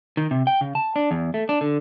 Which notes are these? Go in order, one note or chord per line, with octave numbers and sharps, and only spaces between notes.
D#3
C3
G5
C#3
A5
D4
E2
A3
D4
D3